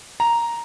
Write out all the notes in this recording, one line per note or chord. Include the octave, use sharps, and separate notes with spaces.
A#5